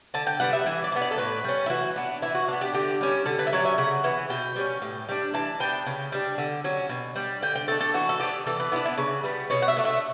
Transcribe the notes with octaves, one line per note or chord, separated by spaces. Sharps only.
D3 A5
G5
G3 B3 D4 F#5
E5
E3 E5
D5
B3 D4
D5
A4
A2 B4
G3 C#4
E4
E3 F#4
B3 D4
E3 E4
F#4
B3 D4
G4
D3 G4
G3 C#4
D3 A4
B4
E5
F#3 C#4 D5
E5
C#3 F#5
E3 B3
B2 G5
G3 C#4
A2
G3 D4
E3 A5
B3 D4 G5
C#3
G3 D4
D3
F#3 C#4
B2
G3 D4
D3 G5
G5
A3 D4 A4
A4
E3 F#4
A4
B3 D4 G4
E3 A4
B4
B3 D4 E4
E4
C#3
G3 B3
B2 C#5
F#5
E5
A3 D4
E5